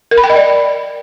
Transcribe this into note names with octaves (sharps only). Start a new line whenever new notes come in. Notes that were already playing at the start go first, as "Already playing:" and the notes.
A#4
B5
G5
D#5
D5